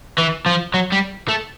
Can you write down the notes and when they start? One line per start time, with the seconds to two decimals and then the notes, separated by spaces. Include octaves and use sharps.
0.18 E3
0.46 F3
0.74 F#3
0.92 G3
1.29 A3